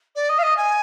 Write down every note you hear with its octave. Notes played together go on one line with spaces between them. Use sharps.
D5
D#5
F5
D#5
G#5